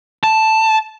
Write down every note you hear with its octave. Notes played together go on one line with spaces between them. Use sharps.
A5